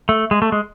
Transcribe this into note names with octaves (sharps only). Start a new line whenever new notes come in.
A3
G#3
A3
G#3